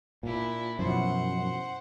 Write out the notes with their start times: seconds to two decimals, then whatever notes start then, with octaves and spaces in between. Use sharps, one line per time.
0.23 A#2 D4 E4
0.79 F#2 B2 F3 E4 C5 F#5